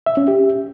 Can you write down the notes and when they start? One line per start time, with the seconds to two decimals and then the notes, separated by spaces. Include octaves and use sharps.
0.06 E5
0.17 C#4
0.28 G4